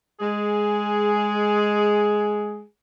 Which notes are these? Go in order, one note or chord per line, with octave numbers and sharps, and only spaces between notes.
G#3 G#4